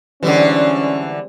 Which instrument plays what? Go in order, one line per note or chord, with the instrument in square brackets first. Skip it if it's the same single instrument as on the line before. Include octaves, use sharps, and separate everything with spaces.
[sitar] D3 E3 [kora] G3 G#3 C4 [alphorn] C#4